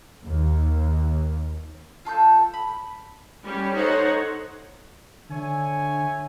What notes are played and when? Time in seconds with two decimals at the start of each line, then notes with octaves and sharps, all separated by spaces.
0.23 D#2
2.05 F4 A4 C#6 G6
2.54 B5
3.42 G3 C#4 G4
3.73 D#4 A4 C5 C#5 D#5 F#5
5.29 D3 C#5 E5 G#5